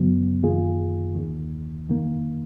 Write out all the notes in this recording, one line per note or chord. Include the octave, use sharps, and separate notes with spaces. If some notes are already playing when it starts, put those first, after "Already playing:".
Already playing: F#2 C#3 F#3 B3
F#2 D#3 A#3 F4 G#4
D#2 D#3 A#3
F2 D#3 A#3